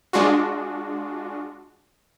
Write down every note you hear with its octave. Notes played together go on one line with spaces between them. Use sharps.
G#3 D4 F4 F#4